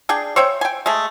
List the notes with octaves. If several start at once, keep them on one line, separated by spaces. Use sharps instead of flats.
D4 G#4 G5
C5 C#5 E5 G5
G5 G#5
G#3 A3